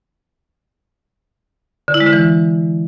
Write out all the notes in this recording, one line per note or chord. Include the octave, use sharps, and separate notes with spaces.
D3
E4
G#3
D3
E3